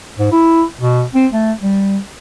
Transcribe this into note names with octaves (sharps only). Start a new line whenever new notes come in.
G#2
E4
B2
C4
A3
G3